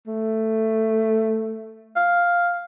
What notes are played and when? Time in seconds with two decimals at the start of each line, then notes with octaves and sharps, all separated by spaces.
0.07 A3
1.96 F5